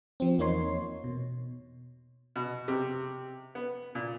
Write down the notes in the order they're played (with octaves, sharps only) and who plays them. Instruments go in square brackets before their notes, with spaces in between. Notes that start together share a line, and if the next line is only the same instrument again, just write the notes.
[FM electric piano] F3 C4
E2 A#3 D#4 C#5 C6
B2
[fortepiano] B2
C3
B3
A#2